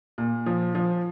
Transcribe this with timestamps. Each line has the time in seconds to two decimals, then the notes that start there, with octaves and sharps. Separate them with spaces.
0.18 A#2
0.46 F3
0.75 F3